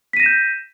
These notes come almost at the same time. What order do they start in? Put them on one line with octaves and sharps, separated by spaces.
B6 D#7 A#6 E7 G6